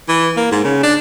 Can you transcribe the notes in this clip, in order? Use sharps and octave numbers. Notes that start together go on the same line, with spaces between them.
E3
A#3
G#2
C#3
D4